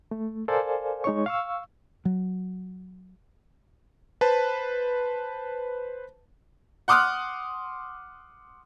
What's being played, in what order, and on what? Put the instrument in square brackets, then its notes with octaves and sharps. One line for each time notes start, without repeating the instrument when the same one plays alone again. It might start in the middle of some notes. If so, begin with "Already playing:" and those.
[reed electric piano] A3
A4 A#4 C5 D5 F5 G#5
G#3 D#4 C#5 C#6
F5 C#6 E6
[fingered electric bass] F#3
[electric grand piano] B4 C5 A5
[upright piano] F#5 C6 D6 D#6 F6 F#6